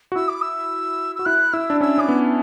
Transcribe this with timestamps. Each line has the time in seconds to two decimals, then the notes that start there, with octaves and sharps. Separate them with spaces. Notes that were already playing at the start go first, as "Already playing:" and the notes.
0.12 F#4
0.16 E4 E6
0.28 D6
0.41 E6
1.16 F#4 E6
1.25 E4 F#6
1.53 E4 E6
1.70 D4
1.81 C#4 E6
1.98 C#4 D6
2.08 B3